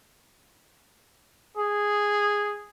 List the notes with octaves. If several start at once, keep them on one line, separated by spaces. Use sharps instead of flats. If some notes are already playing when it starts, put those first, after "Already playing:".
G#4